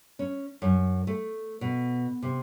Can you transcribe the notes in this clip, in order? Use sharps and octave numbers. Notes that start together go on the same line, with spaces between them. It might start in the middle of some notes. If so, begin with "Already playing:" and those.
C#4
F#2
A3
B2
C3